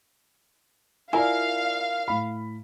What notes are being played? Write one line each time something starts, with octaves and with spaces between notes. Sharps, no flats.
E4 F4 A#4 D5 F5 G#5
A2 B5